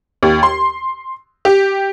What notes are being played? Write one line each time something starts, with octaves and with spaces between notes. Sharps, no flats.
D#2
C6
G4